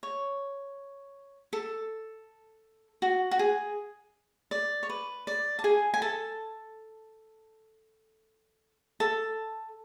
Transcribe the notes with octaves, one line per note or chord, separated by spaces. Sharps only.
C#5
A4
F#4
F#4
G#4
D5
C#5
B4
D5
A5
G#4 G#5
G#5
A4 A5
A4 A5